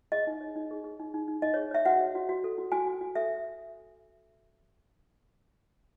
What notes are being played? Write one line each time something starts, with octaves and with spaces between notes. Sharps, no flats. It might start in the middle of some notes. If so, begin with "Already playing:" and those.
G#4 D#5
D#4
C#5
D#4
G#4
G#4
D#4
D#4
D#4
D#4 D#5
G#4 C#5
C#5 E5
F#4 F#5
C#5
F#4
F#4
A4
F#4
F#4 G#5
F#4
F#4
A4 E5